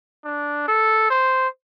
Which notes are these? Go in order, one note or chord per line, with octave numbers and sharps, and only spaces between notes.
D4
A4
C5